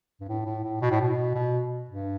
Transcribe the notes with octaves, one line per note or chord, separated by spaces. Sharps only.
G2
A2
A2
A2
B2
A2
B2
B2
G2